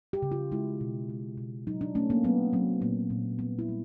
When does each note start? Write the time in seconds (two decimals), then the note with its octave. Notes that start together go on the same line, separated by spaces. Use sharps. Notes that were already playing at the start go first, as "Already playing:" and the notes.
0.13 G4
0.22 C#3
0.32 F4
0.52 G#3 E4
0.81 B2
1.09 G#3
1.38 B2
1.67 F#3 D#4
1.81 D4
1.95 A3 C#4
2.10 A#3
2.24 F#3 B3
2.53 F#3 C4
2.81 A#2 A#3
3.10 A#2
3.39 G3 B3
3.59 E4
3.69 G3